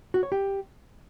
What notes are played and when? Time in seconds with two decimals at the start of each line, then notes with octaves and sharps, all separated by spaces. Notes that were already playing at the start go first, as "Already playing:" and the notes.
0.14 F#4
0.23 C#5
0.32 G4